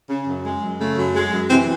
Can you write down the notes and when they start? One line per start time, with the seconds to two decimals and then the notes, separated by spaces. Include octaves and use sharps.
0.10 C#3
0.28 F#2
0.45 G#3
0.63 F#2
0.80 C#3 A3
0.98 F#2
1.15 G#3
1.33 F#2
1.50 C3 E3 C4